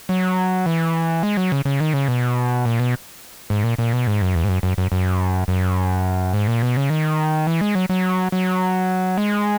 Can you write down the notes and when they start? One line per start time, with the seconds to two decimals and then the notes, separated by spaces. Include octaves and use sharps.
0.09 F#3
0.66 E3
1.23 G#3
1.37 F#3
1.52 C#3
1.65 C#3
1.80 D#3
1.93 C#3
2.08 B2
2.65 A#2
2.80 B2
3.50 G#2
3.64 A#2
3.79 A#2
3.93 B2
4.07 G#2
4.22 F#2
4.35 E2
4.44 G#2
4.49 F#2
4.63 F#2
4.78 F#2
4.92 F#2
5.48 F#2
6.34 G#2
6.48 A#2
6.63 B2
6.77 C#3
6.90 D#3
7.47 E3
7.61 G#3
7.75 F#3
7.89 F#3
8.32 F#3
9.18 G#3